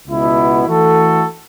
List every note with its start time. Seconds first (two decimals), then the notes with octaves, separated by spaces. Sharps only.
0.08 C#2 B2 B3 E4
0.67 E3 A3 F#4 A4